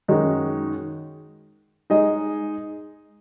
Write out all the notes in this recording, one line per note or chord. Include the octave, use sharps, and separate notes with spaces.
F#2 D#3 G#3 D#4 F#4
G#3 D#4 G#4 D#5